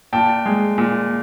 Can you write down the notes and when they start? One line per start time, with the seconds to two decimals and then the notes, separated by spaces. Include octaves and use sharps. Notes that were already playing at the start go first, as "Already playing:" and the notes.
0.13 A#2 G5 A5
0.46 G#3
0.78 A#2